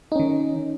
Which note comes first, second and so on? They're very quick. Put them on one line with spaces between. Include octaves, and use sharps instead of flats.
D#4 C#4 D#3